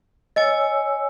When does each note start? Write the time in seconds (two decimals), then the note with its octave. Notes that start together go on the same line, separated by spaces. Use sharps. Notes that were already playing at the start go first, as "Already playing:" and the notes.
0.36 C#5 D#5 G#5 E6